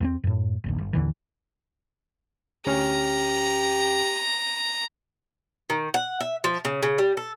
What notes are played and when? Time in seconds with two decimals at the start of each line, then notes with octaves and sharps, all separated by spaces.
0.01 E2 A3 C4
0.24 F#2 A2
0.64 F1 A#1 D#2
0.78 G1
0.93 A1 D#2 D3 E3
2.67 D2 C#4 G4 A#5 F6
5.70 D#3
5.94 F#5
6.21 E5
6.44 F3
6.65 C#3
6.83 C#3
6.98 G3
7.17 A4